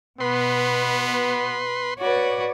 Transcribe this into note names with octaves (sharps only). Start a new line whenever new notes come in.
B2 B3 B4 C6
F#4 B4 C#5 D5